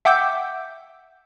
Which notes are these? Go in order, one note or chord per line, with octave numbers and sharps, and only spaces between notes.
E5 F#5 G5 D6 E6 G6